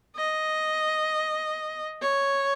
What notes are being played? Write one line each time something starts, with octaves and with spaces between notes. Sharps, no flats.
D#5
C#5